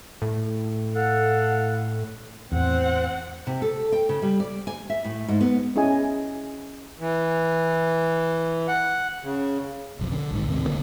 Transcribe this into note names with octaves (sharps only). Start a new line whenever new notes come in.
A2
A4 F5 F#5
E2 A2 C4 F#5
C3
A4
G5
C#3
G3
D5
G#5
E5
A2
G#2
B3
C#4 E4 G#4 D#5 G#5
E3
F#5
C#3
F1 B1 F2
D3
A#1 G#2 D#3
D#2 A2 C3
D#1 D3 A#3